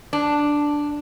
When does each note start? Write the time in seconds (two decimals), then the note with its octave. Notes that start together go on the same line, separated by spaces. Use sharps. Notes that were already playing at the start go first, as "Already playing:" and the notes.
0.13 D4